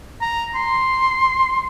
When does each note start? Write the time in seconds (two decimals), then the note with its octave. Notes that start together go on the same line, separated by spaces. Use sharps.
0.21 A#5
0.55 C6